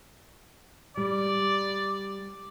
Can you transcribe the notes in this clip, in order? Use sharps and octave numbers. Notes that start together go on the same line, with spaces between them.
G3 D5